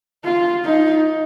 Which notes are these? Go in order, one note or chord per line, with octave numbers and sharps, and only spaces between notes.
F4
D#4